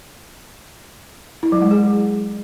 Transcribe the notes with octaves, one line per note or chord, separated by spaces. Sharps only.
E4
F#3
G#3
G#4